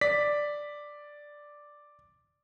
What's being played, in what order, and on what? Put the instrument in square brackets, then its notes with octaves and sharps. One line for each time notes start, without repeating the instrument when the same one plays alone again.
[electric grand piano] D5 B6